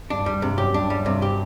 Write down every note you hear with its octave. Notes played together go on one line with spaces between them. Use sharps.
G2 D4
G2 G3
G2 C3
F#2 G4
G2 D4
G3
G2 C3
G4